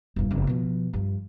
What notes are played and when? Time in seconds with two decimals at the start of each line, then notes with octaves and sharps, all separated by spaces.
0.16 E1 G2
0.31 F#1 F2
0.47 B2 F3
0.93 G2 F3